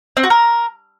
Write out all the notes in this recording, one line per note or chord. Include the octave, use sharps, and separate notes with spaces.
C4
F#4
A#4